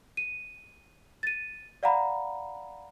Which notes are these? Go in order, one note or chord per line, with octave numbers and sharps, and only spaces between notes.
D#7
A6 D#7
D5 F5 F#5 A#5 B5